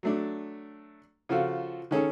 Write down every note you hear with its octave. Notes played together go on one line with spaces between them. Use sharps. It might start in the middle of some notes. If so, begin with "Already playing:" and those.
F#3 A3 D4
C#3 F3 F4 F#4 A4
D#3 C#4 G#4 A4